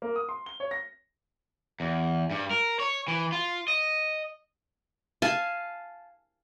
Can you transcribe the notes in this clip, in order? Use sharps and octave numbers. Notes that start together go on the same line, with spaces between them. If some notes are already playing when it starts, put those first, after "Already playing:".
A#3
D#6
C6
G7
C#5
A#6
E2
G2
A#4
C#5
E3
F4
D#5
F5 G#5 A5